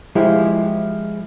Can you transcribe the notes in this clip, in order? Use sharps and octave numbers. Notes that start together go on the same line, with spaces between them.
F3 G#3 E4 G4